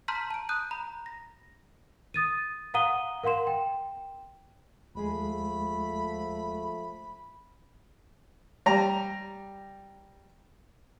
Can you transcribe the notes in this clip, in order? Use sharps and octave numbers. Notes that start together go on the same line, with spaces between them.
A5 A#5 C6 F6 G6 B6
A5 D7
D#6 F#6 G6 D#7
A#5 B5
A#6
D#6 A6 D#7
F5 F#5 A#5 D#6 D#7 G7
A#4 F5 F#5 C6 E7
G5
D#2 F3 G#3 A3 G#4 B5
G3 A#5